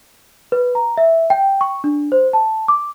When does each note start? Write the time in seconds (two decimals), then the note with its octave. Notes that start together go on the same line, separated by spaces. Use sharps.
0.52 B4
0.75 A#5
0.98 E5
1.30 G5
1.61 C#6
1.84 D4
2.12 C5
2.33 A5
2.68 D6